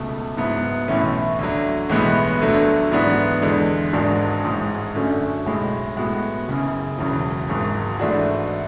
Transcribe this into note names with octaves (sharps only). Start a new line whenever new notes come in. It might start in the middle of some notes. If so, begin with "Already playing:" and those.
Already playing: C#2 B2 A3
G#2 F#3 B3 E4
B1 A2 E3 A3 C#4
D2 D3 F#3
B1 A2 E3 G#3 B3
D2 D3 F#3 A3
G#2 E3 B3 D4 F#4
E2 D3 G#3
G#1 G#2 G#3 D4 F#4
A1 G#2 G#3
F#2 D3 A3 C#4 F#4
B1 A2 G#3
A2 G#3 B3 F#4
F#1 F#2 C#3
E1 E2 C#3 F#3
G#1 G#2 F#3
G#2 E3 A3 D4 F#4